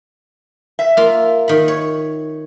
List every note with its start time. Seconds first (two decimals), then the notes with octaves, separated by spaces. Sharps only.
0.79 E5
0.97 A#3 F4
1.48 D#3 B5
1.68 C#5